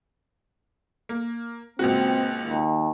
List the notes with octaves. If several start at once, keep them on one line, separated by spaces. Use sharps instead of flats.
A#3
C#2 A#2 C4 F#4
D#2